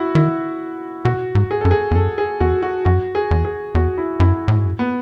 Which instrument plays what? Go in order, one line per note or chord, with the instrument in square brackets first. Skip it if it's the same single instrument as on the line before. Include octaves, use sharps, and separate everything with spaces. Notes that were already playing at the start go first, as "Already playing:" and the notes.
Already playing: [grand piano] E4 F#4
[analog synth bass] D#3 [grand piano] E4
[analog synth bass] B2 [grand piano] F#4
[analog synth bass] G#2
[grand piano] G#4
[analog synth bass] F#2 [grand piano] A4
[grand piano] G#4
[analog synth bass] E2
[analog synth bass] F#2 [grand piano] A4
[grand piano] G#4
[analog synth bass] E2 [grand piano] F#4
[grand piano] F#4
[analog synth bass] F#2 [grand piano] F#4
[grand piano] G#4
[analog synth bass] E2
[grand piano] G#4
[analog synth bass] E2 [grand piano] F#4
[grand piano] E4
[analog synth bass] F#2 [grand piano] E4
[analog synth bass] A2
G#2
F#2
[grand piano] B3